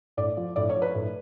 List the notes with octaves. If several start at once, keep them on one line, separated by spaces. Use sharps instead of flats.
A2 D5
F3
A2 D5
C#5
F3
B4
A2